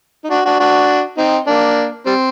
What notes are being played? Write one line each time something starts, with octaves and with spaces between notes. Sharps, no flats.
D#4
D4 F#4
D4 F#4
D4 F#4
C4 D#4
A#3 D4
G3 C4